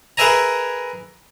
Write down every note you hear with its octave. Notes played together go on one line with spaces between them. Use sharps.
G#4 A#4 B4 E5 G#5 A#5